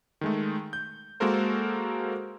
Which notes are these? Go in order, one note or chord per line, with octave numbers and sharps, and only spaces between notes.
D#3 G#3 A3
G6
G#3 A#3 F#4 A4 A#4 C5